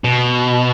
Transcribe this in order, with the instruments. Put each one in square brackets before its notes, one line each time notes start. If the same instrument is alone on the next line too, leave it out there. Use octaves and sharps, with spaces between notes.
[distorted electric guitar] B2